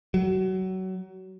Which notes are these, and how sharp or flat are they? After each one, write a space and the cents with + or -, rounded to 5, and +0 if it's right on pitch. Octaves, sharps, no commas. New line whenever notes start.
F#3 +25